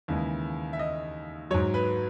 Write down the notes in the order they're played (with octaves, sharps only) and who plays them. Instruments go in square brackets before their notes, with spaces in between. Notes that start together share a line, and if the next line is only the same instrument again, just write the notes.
[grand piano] D#2 C#3 E3 G#3
E5
D#5
F#3 C#5
G#2
B4